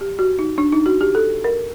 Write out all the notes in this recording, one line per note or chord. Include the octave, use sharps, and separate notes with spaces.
G4
F#4
D#4
D4
D#4
F#4
G4
A4
A#4